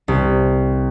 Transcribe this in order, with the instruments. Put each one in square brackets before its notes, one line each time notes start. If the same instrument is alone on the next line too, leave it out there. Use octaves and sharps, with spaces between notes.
[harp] C2